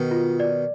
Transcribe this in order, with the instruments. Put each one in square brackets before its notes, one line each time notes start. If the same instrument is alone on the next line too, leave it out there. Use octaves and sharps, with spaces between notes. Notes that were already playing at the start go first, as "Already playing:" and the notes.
Already playing: [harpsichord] B2 D#3
[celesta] F4
D5